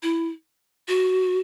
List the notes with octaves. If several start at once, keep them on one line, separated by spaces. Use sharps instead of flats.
E4
F#4